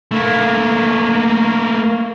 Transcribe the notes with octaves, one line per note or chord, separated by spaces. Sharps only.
A3 A#3